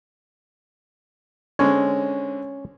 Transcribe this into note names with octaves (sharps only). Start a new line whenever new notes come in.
D3 G#3 C4 C#4 C#5